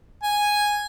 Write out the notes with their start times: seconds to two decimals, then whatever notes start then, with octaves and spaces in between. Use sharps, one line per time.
0.23 G#5